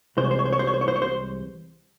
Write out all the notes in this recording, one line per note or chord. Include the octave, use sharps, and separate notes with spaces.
C2 C3 E3 G#3 C5
C#5
C5
C#5
C5
C#5
C5
C#5
C5
C#5
C5
C#5
C5